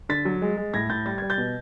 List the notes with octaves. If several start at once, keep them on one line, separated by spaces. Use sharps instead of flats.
D3 A6 B6
F#3
G#3
G#3
A2 G#6 A#6
A2 G6 A6
G3 A6
G3 G#6
G6 A6
B2